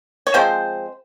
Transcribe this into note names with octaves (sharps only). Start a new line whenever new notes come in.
C#5
F3 G#3 C4 C5